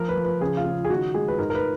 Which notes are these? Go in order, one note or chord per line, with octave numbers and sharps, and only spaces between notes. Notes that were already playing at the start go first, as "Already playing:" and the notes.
Already playing: F3 A#4
B4
F3
B4
C#3 G#4
F4
C#3
G#4
D#3 F#4
G#3 G#4
B4
G#2 A#4
A#4
B4